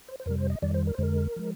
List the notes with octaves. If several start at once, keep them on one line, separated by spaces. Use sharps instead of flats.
C5
C5
F2 C3 G3 A#4
C5
D#5
F2 D#3 G3 D5
C5
A#4
C5
F2 D3 G#3 A#4
F3 G#3